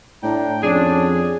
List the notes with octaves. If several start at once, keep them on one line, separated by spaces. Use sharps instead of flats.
A2 D4 G5 A#5
F2 C#4 D4 G#4